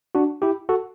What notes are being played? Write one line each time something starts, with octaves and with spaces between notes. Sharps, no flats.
D4 F#4
E4 G4
F#4 A4